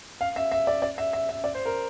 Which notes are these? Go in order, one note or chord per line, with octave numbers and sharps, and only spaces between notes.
F5
E5
E5
D5
D5
E5
E5
E5
D5
C5
A#4